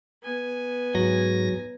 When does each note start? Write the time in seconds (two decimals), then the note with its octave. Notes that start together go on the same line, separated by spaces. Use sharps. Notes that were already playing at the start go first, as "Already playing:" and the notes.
0.23 B3 G#5
0.95 G#2 F#3 A#6